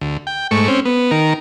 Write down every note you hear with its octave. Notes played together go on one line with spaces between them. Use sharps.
D2
G5
G#2 A3 C#6
C4 C#4
B3
D#3 A#4